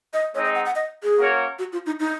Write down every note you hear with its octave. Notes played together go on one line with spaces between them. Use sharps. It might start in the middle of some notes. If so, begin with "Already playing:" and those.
D#5
G#3 C4 D#4 C#5
D#5
F#5
F#5
D#5
G#4
A#3 C#4 F#4 A#4 C#5
F#4
F4
D#4
D#4